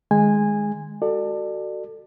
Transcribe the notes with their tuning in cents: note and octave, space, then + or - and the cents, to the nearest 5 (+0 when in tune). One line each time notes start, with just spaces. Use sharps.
D#3 -20 G#3 +0 G#5 -15
F#4 +20 A4 +20 D5 +30